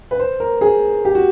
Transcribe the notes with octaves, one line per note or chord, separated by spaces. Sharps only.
B4
C5
A#4
G#4
G4
F#4